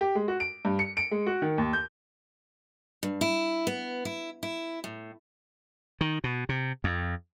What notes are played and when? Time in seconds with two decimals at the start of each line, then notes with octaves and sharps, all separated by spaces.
0.01 G4
0.15 G#3
0.28 F#4
0.40 D7
0.65 G2
0.79 C#7
0.97 D7
1.11 G#3
1.27 F#4
1.42 D#3
1.58 D#2
1.73 G6
3.03 G2
3.21 E4
3.67 B3
4.05 E4
4.43 E4
4.84 A2
6.01 D#3
6.24 B2
6.49 C3
6.84 F2